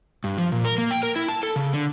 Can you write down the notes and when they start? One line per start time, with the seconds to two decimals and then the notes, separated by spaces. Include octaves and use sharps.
0.24 G2
0.38 F3
0.52 A#2
0.65 A#4
0.78 A#3
0.91 G5
1.03 A#4
1.16 E4
1.28 A5
1.43 A4
1.56 C#3
1.73 D3